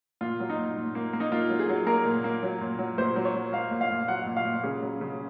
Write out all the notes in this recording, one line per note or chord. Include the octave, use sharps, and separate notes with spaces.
A#2 F4
F#3
D#4
A#2
A#2
A#3
A#3
D#4
A#3 F4
F#3
G#4
F#3
A#3 A#4
A#2
A#3
F#3
A#2
F#3
A#2 C5
F#3
C#5
F#3
A#3 F5
A#2
F5
A#2
F#3 F#5
A#2
F5
A#2
C#3 G#4
F#3
C#3